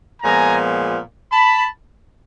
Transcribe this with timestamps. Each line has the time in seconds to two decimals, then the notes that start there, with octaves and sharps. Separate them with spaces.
0.21 A#2 F3 G#3 B3 G#5 A#5
1.31 A5 B5